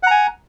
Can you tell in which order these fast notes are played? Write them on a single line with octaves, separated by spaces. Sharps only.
F#5 A#5 G#5